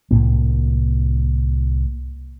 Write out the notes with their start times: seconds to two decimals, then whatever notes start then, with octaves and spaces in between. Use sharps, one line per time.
0.11 C2 F#2 A2 A#3